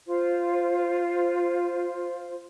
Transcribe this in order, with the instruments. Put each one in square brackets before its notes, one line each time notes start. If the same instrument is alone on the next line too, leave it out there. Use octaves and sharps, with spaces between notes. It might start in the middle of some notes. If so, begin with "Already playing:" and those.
[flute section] F4 C5